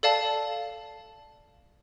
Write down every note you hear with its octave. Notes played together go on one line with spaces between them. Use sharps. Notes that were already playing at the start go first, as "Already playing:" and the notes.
A4 D5 F5 A5